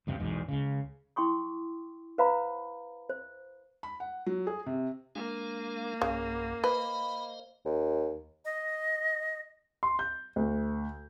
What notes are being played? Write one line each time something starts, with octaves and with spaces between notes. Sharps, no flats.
D2 G2 C3
B1 E2 G#2
C#2 C#3
E4 G5 C6 C#6 D#6
B4 C5 F5 F#5 A#5 B5
C5
B5
F#5
F#3
G#4
C3
G#3 A#3 D4 F5
B1 G2 C#3
B4 C5 D#5 F5 B5
D#2
D#5
C6
G6
D2